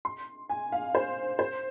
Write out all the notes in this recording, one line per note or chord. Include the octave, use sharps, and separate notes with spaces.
C6
G#5
F5
C5
C5